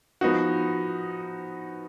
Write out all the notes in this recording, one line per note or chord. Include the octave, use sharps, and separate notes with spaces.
F3 B3 D#4 F#4